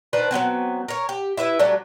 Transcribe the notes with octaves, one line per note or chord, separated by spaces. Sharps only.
D#3 D4 B4 C5
F#3 G#3 B3 C4
A#4 C#5
G4
E4 B4 D#5 E5
F#3 G3 A3 D4